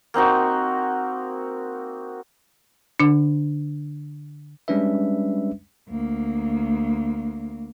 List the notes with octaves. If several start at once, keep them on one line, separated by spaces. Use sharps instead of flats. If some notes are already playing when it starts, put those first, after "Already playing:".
A#3 C4 D#4 F#4
D3 D4
G3 G#3 C#4 D4 B4 E5
D2 A#3